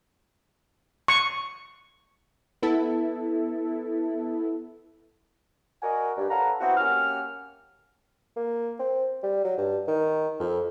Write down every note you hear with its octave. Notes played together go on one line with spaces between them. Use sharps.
C#6
B3 E4 A4
F#4 A#4 D5 D#5 F#5 G#5
G2
A4 B4 C#5 F5 F#5 A#5
B3 C4 E4 F#4
A#3 C#4 F#4 G4 F6
A#3
C4
G3
F#3
G2
D#3
F2